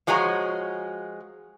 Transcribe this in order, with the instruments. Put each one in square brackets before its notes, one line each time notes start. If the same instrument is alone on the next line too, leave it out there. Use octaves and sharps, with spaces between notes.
[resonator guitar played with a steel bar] F3 G#3 F#4 C#5 G#5 A#5